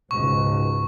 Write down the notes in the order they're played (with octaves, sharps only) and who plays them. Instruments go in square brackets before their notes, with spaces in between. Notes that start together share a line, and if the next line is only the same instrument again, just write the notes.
[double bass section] C#2 G#2 B2 [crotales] C#6